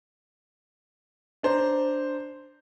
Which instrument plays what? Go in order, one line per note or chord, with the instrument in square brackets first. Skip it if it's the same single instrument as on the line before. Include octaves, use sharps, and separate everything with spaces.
[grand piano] D4 C5 A#5